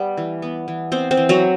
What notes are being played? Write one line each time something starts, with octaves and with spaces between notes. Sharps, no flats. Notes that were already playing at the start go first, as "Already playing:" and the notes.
Already playing: G3 B3
E3
B3
E3
B3 C4 C5
C4 C5
E3
F#3 F#4